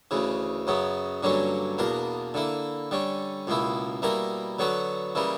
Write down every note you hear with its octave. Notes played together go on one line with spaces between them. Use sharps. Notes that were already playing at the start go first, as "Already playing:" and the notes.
D2 C#3 E3
F#2 C#3 F#3 B3
G2 D3 F#3 A#3 C#4
E2 B2 A#3 D4 A#4
D3 A#3 E4
D3 G3 C#4
C#2 B2 A#3 E4
B2 G3 A#3 E4 A#4
D3 F#3 B3 F#4 B4
C#3 E3 G3 A#3